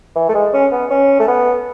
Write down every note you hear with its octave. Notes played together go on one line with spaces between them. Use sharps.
E3
A3
G#3
C#4
B3
C#4
A3
B3